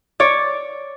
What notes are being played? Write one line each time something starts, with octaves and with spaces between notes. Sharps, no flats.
C#5 D5